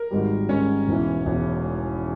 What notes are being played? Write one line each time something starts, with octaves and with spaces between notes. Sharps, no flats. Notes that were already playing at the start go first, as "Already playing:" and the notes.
Already playing: A#4
G#1 G#2 G3
G#1 G#2 G3 C#4 C#5
E1 E2 E3
E1 E2 E3